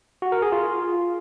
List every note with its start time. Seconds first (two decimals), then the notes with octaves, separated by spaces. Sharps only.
0.22 F#4
0.32 A#4
0.42 G#4
0.52 F4